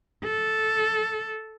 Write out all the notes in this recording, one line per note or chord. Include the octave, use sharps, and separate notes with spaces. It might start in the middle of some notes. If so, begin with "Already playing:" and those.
A4